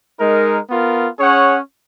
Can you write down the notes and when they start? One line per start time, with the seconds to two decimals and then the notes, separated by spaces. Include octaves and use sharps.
0.20 G#3 D#4 A#4
0.68 B3 F4 A#4
1.19 C#4 G#4 C#5 F#5